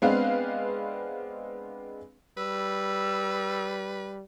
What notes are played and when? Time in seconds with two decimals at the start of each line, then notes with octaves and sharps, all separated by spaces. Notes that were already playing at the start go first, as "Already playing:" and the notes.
0.02 G#3 B3 C4 D4 B4 F5
2.37 G3 B4 E6